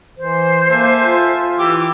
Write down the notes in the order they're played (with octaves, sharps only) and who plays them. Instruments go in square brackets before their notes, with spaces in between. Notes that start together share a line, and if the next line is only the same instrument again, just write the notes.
[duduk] E3 [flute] C5
[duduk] A#3 [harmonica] A4 E5 G#5
[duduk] F4
[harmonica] E3 G4 D6 [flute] E6